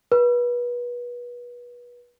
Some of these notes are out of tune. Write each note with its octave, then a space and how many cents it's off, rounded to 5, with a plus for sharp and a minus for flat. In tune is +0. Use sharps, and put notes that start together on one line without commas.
B4 -30